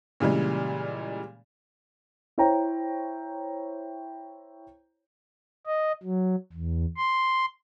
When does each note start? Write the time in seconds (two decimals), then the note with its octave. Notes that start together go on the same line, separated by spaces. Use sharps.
0.20 A#2 C#3 E3 G3 G#3
2.38 E4 C5 C#5 G5 A#5
5.66 D#5
6.03 F#3
6.52 E2
6.96 C6